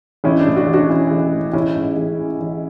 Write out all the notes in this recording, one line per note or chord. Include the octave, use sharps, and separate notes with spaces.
A1 C#4 E4
D4
A2
D4 F#4
A1
D4 F#4
E3 C#4 E4
A1
A2
A1 C#4 E4
G#2
A1
E3
A1